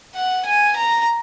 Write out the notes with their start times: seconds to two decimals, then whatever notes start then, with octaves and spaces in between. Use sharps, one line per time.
0.15 F#5
0.45 G#5
0.76 A#5